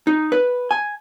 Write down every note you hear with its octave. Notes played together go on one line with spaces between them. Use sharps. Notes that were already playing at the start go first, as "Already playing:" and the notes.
D#4
B4
G#5